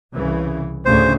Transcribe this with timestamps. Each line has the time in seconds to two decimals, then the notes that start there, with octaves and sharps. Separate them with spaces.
0.14 C2 C#3 E3
0.85 D2 A2 C#3 C5